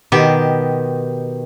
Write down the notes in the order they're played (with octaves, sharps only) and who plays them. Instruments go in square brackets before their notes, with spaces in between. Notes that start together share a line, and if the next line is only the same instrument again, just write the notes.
[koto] B2 D#3 G4